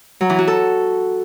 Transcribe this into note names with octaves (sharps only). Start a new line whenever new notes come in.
F#3
E3
F#4
A4